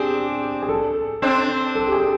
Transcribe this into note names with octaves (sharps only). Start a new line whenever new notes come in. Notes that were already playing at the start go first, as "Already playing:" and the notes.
Already playing: C4 D4 G4 G#4
G#4
A4
C4 D4
A4
G4
G#4